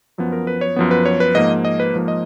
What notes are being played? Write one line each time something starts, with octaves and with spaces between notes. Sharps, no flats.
F#2 F3 B3
A#4
B4
C#5
F#2 F3 B3
B4
C#5
B4
G#2 F3 A#3 D#5
D#5
B4
G#2 F3 A#3
D#5